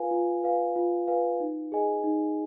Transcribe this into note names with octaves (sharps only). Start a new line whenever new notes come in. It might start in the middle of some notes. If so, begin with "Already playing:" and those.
Already playing: F4 B4 F5 G#5
F4
B4 F5 G#5
F4
B4 F5 G#5
D#4
G#4 D#5 G#5
D#4